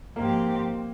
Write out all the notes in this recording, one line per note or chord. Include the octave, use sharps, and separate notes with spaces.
G#2 F3 A#3 C4 G4